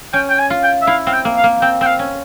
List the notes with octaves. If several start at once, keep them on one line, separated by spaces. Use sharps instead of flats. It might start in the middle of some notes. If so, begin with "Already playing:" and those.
C#4 G5
G5
G#5
F4
G5
E5
E4 F5
C4 F5
G5
A#3
F5
A#3
C4 G5
C4 G5
F5
C#4